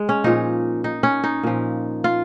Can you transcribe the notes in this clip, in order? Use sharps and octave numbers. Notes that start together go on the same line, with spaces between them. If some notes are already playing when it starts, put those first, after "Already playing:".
Already playing: G#3
C#4
A#2 F3 D#4
D#4
C#4
D#4
A#2 F3
F4